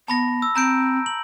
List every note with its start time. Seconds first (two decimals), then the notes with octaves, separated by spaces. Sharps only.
0.08 B3 A5 B5 A#6
0.42 E6
0.56 C4 A#5 G6 D7
1.06 F#7